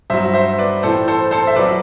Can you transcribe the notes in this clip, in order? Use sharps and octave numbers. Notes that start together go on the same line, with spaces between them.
G2 F#3 C5 E5
C5 E5
B4 D5
A2 E3 A4 C5
A4 C5
A4 C5
E5
F#2 F#3 B4 D5